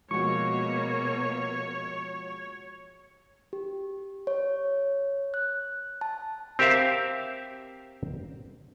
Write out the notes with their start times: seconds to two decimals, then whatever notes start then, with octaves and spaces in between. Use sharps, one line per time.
0.11 B2 F3 G#3 A#3 F#4 C#5 C#6
3.53 G4
4.27 C#5
5.34 F#6
6.01 A5
6.59 C4 G4 A#4 C5 E5 F5